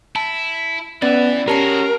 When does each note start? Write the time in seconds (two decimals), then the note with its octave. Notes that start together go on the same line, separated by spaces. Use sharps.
0.16 E4 A5
1.02 E3 B3 C#4 E4 D5 A6
1.48 G#3 C#4 F#4 G4 A#4 A5 C7